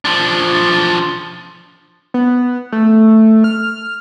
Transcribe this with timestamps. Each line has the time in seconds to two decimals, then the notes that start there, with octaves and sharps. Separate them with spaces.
0.05 F3 D4
2.14 B3
2.72 A3
3.44 F6